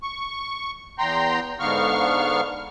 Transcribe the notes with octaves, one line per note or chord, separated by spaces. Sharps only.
C#6
E2 G5 A#5 C6
G#2 D3 B3 F5 C#6 F6